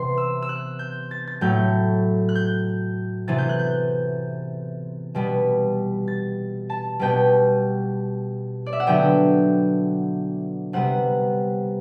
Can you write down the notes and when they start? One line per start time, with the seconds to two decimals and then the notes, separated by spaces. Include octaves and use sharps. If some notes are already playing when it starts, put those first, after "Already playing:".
Already playing: C3 E3 B3 C6
0.18 E6
0.42 E6
0.49 F#6
0.79 G6
1.11 A6
1.27 A6
1.41 A2 F#3 A3 G6
2.29 F#6
2.35 G6
3.28 C3 E3 B3 A6
3.38 G6
3.49 F#6
3.59 G6
5.15 B2 G3 B3
6.08 A6
6.70 A5
7.00 B2 G3 B3 G5
8.66 D5
8.73 E5
8.80 F#5
8.87 D3 F#3 B3 G5
10.73 C3 G3 B3 F#5